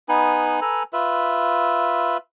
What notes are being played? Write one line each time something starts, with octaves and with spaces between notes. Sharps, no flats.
B3 D#4 B4 G#5
A4 B4 G#5 A#5
F4 B4 E5